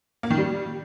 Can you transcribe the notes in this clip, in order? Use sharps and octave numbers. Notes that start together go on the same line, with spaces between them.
A#3
D#3
G3